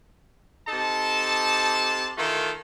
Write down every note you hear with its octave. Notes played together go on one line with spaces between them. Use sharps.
C3 D#4 A4 A5
D#3 E3 A3 F4 A4